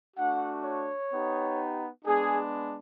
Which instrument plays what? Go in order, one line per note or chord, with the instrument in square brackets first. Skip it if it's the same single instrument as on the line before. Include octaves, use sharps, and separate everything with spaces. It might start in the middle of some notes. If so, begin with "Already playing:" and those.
[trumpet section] A3 D4 F#4 F#5
C#5
B3 D#4 G4
G#3 B3 D4 G#4